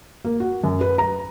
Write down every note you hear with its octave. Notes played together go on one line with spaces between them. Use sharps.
A#3
F#4
F#2
B4
A#5